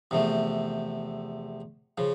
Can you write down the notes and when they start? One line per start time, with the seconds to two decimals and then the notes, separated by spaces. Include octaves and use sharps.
0.11 E2 C3 F3 A3
1.98 C#3 F3